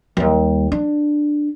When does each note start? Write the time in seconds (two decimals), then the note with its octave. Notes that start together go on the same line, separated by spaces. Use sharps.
0.17 D#2 G3
0.72 D4